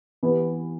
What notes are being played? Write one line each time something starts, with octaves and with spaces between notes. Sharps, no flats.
E3 B3 E4 G4 B4